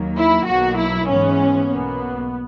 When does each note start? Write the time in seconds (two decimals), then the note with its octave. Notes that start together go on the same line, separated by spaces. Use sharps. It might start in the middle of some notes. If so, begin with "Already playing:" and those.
Already playing: D#2 D#3 F#3 A#3
0.17 E4
0.46 B1 B2 F#3 A#3 F#4
0.77 E4
1.07 G#2 E3 G#3 B3 C#4
1.68 B1 B2 A#3 B3